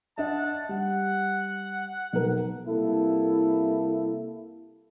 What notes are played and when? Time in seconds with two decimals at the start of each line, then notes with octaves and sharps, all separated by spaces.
0.18 D4 D#5 E5 F#5 A5
0.69 G3 F#5
2.13 B1 A#4
2.66 C2 A#3 E4 A4